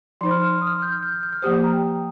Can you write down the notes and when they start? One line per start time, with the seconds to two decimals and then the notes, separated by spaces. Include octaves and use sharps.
0.21 F3 D#4 C5 C6
0.31 F6
0.41 F6
0.61 D#6
0.67 F6
0.82 G6
0.92 F6
1.03 G6
1.12 F6
1.23 G6
1.32 F6
1.42 F3 A#3 G4 C5 D#6
1.64 A#5
1.73 G5